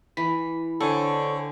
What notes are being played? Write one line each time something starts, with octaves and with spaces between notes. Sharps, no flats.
E3 B6
D3 C4 D4 A4 C#5 G#5